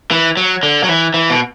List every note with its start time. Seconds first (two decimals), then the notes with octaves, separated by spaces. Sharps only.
0.11 E3
0.37 F#3
0.63 D3
0.84 F#3
0.89 E3
1.14 E3
1.30 B2